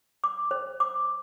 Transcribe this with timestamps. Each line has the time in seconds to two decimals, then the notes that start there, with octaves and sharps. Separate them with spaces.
0.24 D6
0.51 C5
0.80 D6